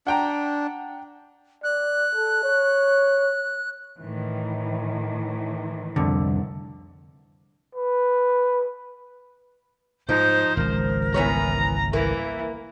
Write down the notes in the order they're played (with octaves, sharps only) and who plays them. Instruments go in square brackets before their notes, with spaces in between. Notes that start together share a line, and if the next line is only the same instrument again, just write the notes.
[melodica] D4 [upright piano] F#5 G5 A#5
[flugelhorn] D5 [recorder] F#6
[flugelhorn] A4
C#5
[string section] A2 D#3 E3
[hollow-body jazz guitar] C2 F2 D3
[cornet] B4
[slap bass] G#2 [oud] F3 [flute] D#4 [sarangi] C5
[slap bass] G#1 C#2 [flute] A#4
[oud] E3 B3 C#5 [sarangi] A#5
[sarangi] E3 [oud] A#3 [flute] E5